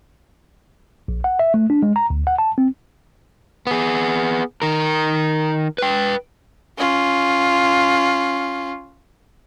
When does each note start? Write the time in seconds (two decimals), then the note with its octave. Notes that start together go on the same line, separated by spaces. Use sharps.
1.08 A#1
1.24 F#5
1.39 E5
1.54 A3
1.70 D4
1.83 G#3
1.96 A#5
2.10 D2
2.27 F#5
2.38 A5
2.58 C4
3.67 B3 G#4
4.62 D#3 A#4
5.78 B4 G5
6.77 C#4 F4